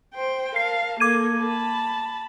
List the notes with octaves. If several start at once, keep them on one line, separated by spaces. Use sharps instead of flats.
C5 G5
A#4 F5 A5 C7
A#3 A4 D6 G#6 D#7
A5 B5